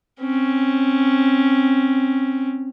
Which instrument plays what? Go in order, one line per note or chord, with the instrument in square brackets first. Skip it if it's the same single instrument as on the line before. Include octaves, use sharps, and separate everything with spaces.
[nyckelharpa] C4 C#4